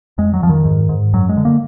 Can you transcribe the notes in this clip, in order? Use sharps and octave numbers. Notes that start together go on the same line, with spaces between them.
F2 G#3
F#3
F2 F3
D#3
G#2
G#2
F#2 F#3
G#3
D3
A#3